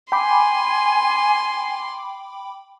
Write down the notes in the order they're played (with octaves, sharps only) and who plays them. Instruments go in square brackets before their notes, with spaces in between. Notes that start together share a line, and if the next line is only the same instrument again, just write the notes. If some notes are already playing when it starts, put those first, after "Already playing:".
[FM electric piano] G5 B5 D6 [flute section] G#5 [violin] C6